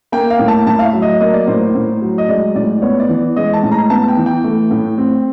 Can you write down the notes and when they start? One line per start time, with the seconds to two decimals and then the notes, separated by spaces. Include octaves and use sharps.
0.12 A#3 G5
0.30 F5
0.39 A2
0.48 A5
0.66 A2 A5
0.79 F5
0.85 E5
0.93 F#3
1.02 D#5
1.20 A#3 D#5
1.34 D5
1.47 A2 C5
1.61 C5
1.75 A2
2.01 F#3
2.18 D#5
2.28 G#3 D5
2.55 A2 D5
2.82 B3 C#5
3.00 D5
3.09 E3
3.36 G#3 D#5
3.54 A5
3.63 A2
3.72 A#5
3.90 B3 A5
4.08 G5
4.17 E3
4.26 G5
4.44 A3
4.71 A2
4.98 C4